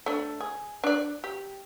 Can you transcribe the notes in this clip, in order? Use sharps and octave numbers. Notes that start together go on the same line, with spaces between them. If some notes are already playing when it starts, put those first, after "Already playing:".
A3 D4
G#4
D4 D5
G4